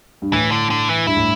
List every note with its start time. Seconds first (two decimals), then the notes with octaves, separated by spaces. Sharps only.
0.22 G2
0.33 A2 E3
0.51 D3
0.71 D3
0.89 E3
1.07 G2 E4
1.17 A2